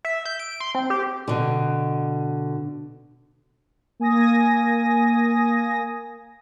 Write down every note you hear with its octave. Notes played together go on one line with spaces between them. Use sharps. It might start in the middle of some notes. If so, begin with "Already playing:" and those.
E5
G6
D7
C6
C4
G4
B2 D3
A#3 G#5 D#6 A#6